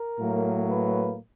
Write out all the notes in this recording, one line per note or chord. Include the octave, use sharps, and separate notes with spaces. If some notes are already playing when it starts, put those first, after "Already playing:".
Already playing: A#4
A2 F#3 A#3
B4